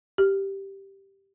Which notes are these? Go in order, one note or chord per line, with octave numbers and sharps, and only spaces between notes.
G4